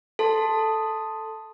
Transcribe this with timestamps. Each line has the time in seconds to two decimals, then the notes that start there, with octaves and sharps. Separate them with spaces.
0.19 A4 A5 C6